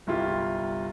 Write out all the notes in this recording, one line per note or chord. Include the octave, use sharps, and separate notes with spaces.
G1 C2 E4 F4 G4